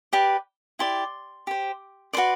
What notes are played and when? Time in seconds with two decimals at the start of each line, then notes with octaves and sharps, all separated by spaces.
0.13 G4 B4 D5
0.79 E4 G4 D5 C6
1.47 G4 C5
2.13 F#4 B4 D5 C6